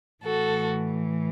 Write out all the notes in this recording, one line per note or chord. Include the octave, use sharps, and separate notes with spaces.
A2 E3 F#4 A4